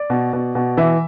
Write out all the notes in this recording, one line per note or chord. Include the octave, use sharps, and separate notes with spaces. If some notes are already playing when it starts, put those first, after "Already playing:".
Already playing: D5
B2
B2
B2
E3 E5